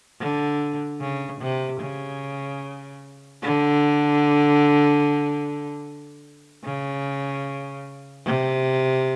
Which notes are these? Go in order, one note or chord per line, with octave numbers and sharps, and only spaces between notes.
D3
C#3
C3
C#3
D3
C#3
C3